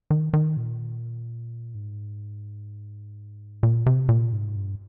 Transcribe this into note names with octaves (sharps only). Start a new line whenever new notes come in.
D#3
D#3
A#2
G#2
A#2
C3
A#2
G#2
G2